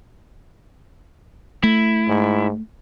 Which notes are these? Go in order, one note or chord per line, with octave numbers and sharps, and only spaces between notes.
A3 E4
G#2